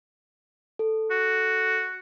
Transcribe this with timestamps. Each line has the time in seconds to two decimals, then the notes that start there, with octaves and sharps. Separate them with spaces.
0.79 A4
1.11 F#4